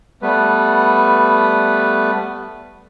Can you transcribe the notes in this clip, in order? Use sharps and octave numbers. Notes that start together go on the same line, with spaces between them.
G3 A3 B3 B4